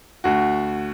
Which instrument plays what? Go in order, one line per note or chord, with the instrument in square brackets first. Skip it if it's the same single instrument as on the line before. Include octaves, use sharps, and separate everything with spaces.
[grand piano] D2 F#4